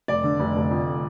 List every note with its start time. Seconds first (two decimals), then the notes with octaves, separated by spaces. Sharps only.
0.08 F1 D5
0.24 D3
0.39 F1
0.55 F1
0.71 F2